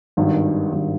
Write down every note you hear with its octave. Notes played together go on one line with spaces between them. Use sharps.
G#1 G2 D#3
G#1 G2 D#3